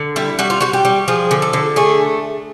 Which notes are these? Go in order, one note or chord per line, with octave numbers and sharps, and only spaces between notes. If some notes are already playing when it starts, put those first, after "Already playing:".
Already playing: D3
G3 E4
G3 F#4
F4
G3 F#4
G4
G3
F3 G#4
D3
A4
D3
A3 G#4